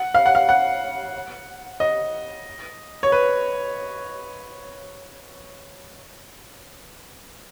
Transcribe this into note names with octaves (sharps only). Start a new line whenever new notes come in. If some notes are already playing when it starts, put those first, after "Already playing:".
Already playing: F#5
F5
F#5
F5
F#5
D#5
C#5
B4